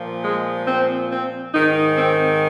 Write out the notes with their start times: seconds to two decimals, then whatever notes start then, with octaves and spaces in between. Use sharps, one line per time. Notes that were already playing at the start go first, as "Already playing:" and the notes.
Already playing: A#2 F3
0.25 G#3
0.68 C4
1.10 C4
1.53 G#2 D#3 D#4
1.97 C4